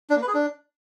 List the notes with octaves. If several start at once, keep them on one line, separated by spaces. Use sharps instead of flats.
D4
A#3
B4
G#4
D4